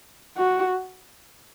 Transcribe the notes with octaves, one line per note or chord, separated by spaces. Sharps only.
F#4